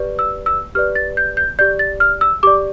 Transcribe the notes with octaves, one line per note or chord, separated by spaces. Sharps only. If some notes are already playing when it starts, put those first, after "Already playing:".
Already playing: G4 B4 D5
E6
E6
G4 B4 D5 F6
A6
G6
G6
G4 D5 G6
A6
F6
E6
G4 D5 D6